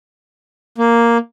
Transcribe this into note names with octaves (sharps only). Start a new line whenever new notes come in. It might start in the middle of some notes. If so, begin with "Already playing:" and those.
A#3